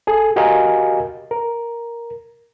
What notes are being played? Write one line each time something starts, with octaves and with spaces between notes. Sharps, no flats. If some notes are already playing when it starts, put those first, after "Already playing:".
G#4 A4
F#4 G4 A#4 D#5 F5 G#5
A#4